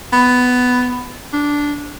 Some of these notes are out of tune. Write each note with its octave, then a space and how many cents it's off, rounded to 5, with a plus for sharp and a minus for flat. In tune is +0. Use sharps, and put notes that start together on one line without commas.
B3 +10
D4 -10